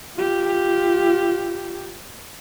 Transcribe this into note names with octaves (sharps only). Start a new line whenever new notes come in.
F4 G4